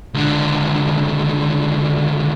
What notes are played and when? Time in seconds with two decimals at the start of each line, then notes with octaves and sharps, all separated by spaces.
0.14 C#2 D3